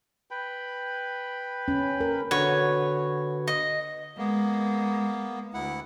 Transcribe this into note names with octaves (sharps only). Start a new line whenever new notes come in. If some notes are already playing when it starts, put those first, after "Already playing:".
B4 G5 B5
C#4
A#4
D3 F#4 B4 C#5
D#5
G#3 A#3 B3
D2 E4 F#5